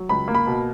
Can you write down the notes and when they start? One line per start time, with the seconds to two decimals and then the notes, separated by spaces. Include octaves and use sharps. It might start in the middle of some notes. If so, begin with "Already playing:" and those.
Already playing: F#3
0.09 C#2 B5
0.28 A#3
0.35 B5
0.47 B2